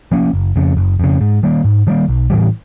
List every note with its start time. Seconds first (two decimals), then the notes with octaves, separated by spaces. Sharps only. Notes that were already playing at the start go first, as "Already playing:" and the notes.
0.12 F3 A#3 C#4
0.33 F#1
0.56 F2 C#3
0.77 F#1
1.00 F2 C#3
1.21 G#2
1.43 D#3 G3 A#3
1.64 G#2
1.87 D#3 G3 A#3
2.08 B1
2.30 A2 E3 G3